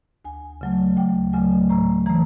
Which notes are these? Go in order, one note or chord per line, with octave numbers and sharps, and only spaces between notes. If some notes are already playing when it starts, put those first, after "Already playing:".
D2 G#5
C#3 F#3 A3
D2 G5
C#3 F#3 A3 G#5
A2 A#5
E3 A3 A#5